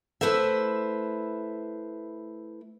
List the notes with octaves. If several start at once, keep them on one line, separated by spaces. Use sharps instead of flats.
A3 E4 B4 C5 E5